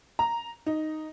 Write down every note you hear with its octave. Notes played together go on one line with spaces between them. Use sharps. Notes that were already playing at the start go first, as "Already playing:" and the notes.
A#5
D#4